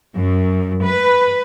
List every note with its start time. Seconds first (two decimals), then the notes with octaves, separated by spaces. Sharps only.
0.16 F#2
0.83 B4